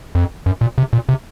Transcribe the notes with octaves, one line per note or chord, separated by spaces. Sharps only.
F2
F#2
A#2
C3
A#2
C3